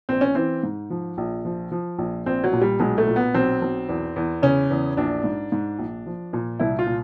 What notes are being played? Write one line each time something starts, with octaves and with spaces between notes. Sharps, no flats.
A#1 C4
C#4
E3 C4
G#2
F3
A#1
F3
F3
A#1
A#1 C4
F#3
A#2
G3
B1 G#3
A3
A#2
B3
B1 C4
B1
E2
E2
C#3 C#4
E2
A#1 D4
G#2
G#2
A#1
F3
A#2
C2 E4
F4
A#2